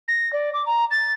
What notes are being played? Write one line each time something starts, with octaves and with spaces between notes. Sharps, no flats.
A#6
D5
D6
A#5
A6